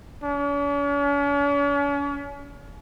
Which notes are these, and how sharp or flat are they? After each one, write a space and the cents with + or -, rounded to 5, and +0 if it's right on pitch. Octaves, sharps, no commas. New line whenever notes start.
C#4 +45